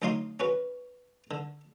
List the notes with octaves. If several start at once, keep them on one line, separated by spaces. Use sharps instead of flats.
D2 F#3 D#4 F5 C6 D#6
C#4 F#4 B4
D3